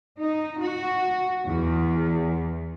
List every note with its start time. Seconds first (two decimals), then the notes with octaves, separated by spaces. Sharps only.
0.20 D#4
0.61 F#4
1.47 E2